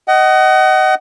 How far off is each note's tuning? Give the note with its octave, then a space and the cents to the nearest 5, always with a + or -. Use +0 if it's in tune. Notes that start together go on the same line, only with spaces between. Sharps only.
D#5 +0 F#5 +30